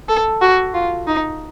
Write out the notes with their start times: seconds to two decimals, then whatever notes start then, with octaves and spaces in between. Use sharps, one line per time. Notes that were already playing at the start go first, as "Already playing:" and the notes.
0.09 A4
0.41 F#4
0.74 F4
1.07 D#4